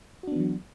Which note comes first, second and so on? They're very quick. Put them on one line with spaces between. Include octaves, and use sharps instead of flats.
F#4 D4 B3 E3 F#3